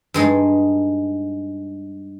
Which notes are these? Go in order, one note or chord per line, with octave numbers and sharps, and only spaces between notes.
G2 G#3 D#4